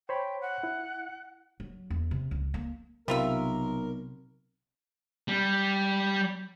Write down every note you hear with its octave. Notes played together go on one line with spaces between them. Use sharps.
C5 C#5 G5 B5
F#5
E4
F#3
E2
C3
C#2
A#3
B1 C3 G3 F4 A#4 E5
G3